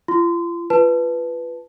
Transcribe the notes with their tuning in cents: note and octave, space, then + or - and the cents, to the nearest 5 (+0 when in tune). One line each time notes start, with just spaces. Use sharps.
F4 -40 C6 -25
F4 -20 B4 +0 A5 -5